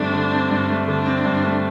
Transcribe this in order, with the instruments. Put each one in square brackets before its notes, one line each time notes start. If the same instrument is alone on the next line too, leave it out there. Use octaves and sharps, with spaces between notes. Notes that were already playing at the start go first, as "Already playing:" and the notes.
Already playing: [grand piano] G2 D3 A3 C4 [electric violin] D4
[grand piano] D3
C4
G2
A3
[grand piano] D3 [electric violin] D4
[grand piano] C4
G2
A3